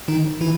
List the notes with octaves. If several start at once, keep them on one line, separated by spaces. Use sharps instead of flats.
D#3 D#4
E3 E4